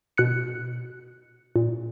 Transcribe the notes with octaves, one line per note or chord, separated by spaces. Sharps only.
B2 F#6 C#7
A#2